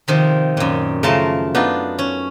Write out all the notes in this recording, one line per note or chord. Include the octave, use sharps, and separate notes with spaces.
C3 D#3 F3
F#2 A#2
C#3 F3 A3 A#4 A5 C6
B3 D4 D#4 F4
C#4